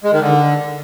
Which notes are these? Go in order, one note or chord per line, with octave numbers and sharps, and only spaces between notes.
G#3
D#3
D3